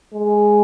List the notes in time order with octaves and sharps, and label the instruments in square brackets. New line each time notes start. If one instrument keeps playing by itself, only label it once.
[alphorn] G#3